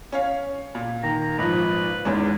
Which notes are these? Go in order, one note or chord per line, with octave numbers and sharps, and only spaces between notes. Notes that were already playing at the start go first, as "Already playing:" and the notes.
C#4 C#5 F5
A#2
D#3 A#5
G#1 F3 B4
E2 G#2 C#4